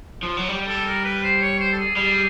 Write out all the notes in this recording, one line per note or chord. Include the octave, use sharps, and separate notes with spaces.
F3
F#3
G3
A4
A#4
B4
C5
C#5
C5
A4
G#4
G3 G#4